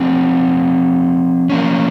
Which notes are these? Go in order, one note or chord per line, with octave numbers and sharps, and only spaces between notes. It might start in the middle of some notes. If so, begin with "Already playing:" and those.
Already playing: F3 C4 D#4
F3 A#3 C#4